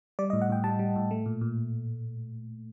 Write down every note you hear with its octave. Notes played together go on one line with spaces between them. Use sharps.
G3 D5
D#5
A2
F#5
A2 G5
G3 A5
G3
A2
A3
A#2
A#2